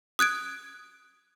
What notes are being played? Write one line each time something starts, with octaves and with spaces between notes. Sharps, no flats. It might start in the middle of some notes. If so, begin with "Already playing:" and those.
D#6 F#6 G#6 D7